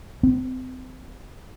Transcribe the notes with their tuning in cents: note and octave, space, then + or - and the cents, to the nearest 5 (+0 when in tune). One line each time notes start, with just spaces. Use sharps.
C4 -35